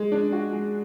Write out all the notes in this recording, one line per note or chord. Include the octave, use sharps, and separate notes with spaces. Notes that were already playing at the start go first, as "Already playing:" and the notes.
Already playing: G#3
D4
F#4
G#3